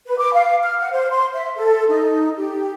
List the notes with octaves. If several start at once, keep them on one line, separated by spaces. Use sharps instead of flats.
B4
D6
F5
F6
F#5
C5
C6
E5
A4
D#4
G4